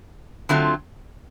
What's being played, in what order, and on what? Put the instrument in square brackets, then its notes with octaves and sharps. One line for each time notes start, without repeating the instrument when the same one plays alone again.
[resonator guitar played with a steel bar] D3 F#3 A3 C4 F4